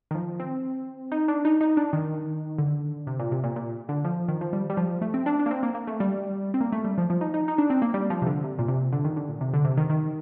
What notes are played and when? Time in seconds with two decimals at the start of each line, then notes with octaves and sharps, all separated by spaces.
0.11 D#3
0.15 F3
0.40 C4
1.12 D#4
1.28 D4
1.45 D#4
1.61 D#4
1.77 D4
1.93 D#3
2.58 D3
3.07 C3
3.19 A#2
3.32 C3
3.44 A#2
3.56 A#2
3.89 D3
4.05 F3
4.28 D#3
4.41 F3
4.53 G3
4.70 G3
4.77 F3
5.02 A3
5.14 C4
5.26 D4
5.39 D4
5.46 A#3
5.51 C4
5.63 A#3
5.75 A#3
5.87 A3
6.00 G3
6.54 C4
6.61 A#3
6.72 A3
6.84 G3
6.98 F3
7.10 F3
7.21 D#4
7.34 D#4
7.48 D#4
7.58 D4
7.70 C4
7.82 A#3
7.94 G3
8.10 F3
8.22 C3
8.27 D3
8.44 C3
8.59 A#2
8.68 C3
8.92 D3
9.05 D#3
9.16 D3
9.29 A#2
9.41 C3
9.54 D3
9.65 C3
9.77 D#3
9.90 D#3